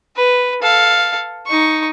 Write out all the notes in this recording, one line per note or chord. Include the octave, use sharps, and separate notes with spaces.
B4
A4 F5
D#4 C#6